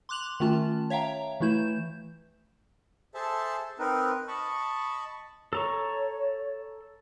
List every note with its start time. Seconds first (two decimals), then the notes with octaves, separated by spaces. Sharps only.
0.09 C6 D6 F#6 F7 F#7
0.40 D#3 A3 C#4 F4 A5
0.90 C#5 E5 F5 G5 A#5
1.40 E3 A3 E4 G6 E7
3.14 G#4 A4 C5 E5 A5
3.79 C4 D#4 A#4 B4
4.28 D#5 A5 B5 C#6
5.53 A4 C#5 A#5 C#6